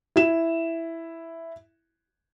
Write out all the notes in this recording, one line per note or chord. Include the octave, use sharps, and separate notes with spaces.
E4 E7